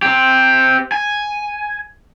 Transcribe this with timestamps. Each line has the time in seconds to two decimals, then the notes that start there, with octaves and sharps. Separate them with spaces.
0.02 C4 G4
0.92 G#5